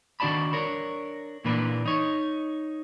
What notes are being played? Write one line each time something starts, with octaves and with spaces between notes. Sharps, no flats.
D#3 D4 F#4 D5 A5 B5
D4 A#4 C#5
A#2 E3 A#3 D4 B4
D#4 C#5